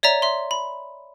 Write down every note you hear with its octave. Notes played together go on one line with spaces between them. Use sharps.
C#5 D5 E5 A#5
E5 C6
B5